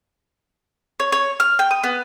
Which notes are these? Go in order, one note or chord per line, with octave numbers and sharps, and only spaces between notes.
C#5
C#5
F6
G5
D#6
B3